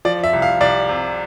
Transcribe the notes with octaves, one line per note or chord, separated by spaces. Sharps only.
F3 D5
E5
C2
F5
C2 D5
C3